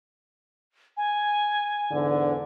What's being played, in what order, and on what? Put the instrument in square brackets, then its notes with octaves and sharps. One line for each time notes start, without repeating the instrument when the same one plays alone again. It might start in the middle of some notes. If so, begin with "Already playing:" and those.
[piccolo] G#5
[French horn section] E2 G#2 D3